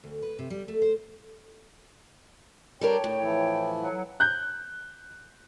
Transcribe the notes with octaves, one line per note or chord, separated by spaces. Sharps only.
D2
B4
C3
G3
A3
C5
G3 D4 A#4 C#5 G5
A2
E3 F3 E4
F#3 F#5
F#6 G6